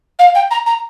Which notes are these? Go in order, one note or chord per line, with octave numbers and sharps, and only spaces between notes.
F5
G5
A#5
A#5